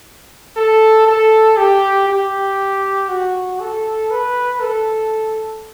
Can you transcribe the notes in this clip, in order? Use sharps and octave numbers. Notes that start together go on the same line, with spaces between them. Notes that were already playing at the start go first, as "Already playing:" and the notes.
A4
A4
G4
G4
F#4
A4
B4
A4